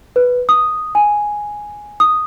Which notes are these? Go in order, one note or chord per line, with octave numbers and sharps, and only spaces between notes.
B4
D#6
G#5
D#6